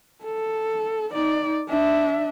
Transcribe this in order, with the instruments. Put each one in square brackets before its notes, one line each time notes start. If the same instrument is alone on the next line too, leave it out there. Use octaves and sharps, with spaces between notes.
[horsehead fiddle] A4
D#4 D5
D4 E5